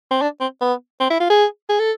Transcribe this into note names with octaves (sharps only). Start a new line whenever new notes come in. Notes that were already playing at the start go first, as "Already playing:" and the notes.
C4
D4
C4
B3
C4
E4
F4
G#4
G#4
A4